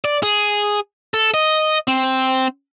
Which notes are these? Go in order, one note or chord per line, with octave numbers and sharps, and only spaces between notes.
D5
G#4
A4
D#5
C4